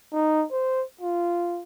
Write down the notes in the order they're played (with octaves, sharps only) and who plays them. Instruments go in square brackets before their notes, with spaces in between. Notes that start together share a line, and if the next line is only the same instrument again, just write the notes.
[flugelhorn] D#4
C5
F4